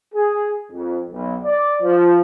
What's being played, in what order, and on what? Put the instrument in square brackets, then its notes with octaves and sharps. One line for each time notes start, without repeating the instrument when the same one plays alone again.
[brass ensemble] G#4
F2
B1
D5
F3